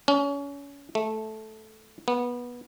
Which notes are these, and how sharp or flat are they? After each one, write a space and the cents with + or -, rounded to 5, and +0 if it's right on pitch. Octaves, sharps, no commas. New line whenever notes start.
C#4 +30
A3 -10
B3 -20